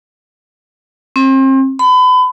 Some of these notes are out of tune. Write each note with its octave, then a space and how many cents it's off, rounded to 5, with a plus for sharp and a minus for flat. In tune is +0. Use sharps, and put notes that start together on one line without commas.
C4 +35
B5 +35